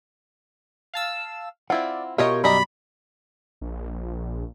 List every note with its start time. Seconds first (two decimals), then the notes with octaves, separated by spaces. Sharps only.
0.94 F5 A5 E6
1.70 C4 E4 F4 D5 F#5
2.18 B2 F4 G4 A#4 C#5 D#5 E5 G5
2.44 F#2 G3 D5 D#5 A#5 B5
3.61 A#1